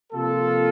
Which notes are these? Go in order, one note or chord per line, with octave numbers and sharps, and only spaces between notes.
C3 F3 A#3 F4 A4